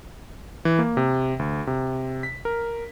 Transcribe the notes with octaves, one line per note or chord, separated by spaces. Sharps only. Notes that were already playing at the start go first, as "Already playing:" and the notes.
E3
A#3
C3
D2
C3
B6
A#4